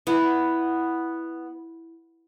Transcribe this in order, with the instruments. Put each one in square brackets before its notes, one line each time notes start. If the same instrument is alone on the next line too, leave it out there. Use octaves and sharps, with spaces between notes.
[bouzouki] B3 [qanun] E4